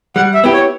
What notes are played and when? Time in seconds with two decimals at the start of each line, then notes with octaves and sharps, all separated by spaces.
0.16 G3 F#5
0.34 E5
0.44 B3 E4 G4
0.53 C#5